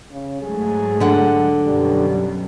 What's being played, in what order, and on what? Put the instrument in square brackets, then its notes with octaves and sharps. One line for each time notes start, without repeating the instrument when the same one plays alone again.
[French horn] C#3
[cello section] G#2 F#3 A3 [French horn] G#4
[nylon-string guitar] D3 F#5
[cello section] F#2 B2 [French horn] G3